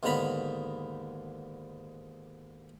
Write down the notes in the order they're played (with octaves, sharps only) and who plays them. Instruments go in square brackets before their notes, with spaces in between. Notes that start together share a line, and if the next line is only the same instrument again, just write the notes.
[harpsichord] D#2 G#2 D3 B3 A#5 B5